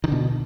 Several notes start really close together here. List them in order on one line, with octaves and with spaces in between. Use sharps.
D#3 D3 B2